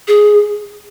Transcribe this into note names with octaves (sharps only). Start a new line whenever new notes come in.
G#4